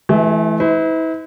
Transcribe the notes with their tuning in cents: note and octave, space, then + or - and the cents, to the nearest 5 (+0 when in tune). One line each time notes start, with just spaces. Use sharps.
E3 +0 A3 -40 E4 +0
E4 -40 B4 +45